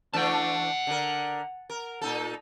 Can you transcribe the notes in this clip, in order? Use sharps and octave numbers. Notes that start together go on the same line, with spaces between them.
E3 A3 D4 F#5 A5
D3 A#4
A#4
A#2 D#4 A4